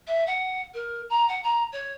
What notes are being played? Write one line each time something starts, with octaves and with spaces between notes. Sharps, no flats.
E5
F#5
A#4
A#5
F#5
A#5
C#5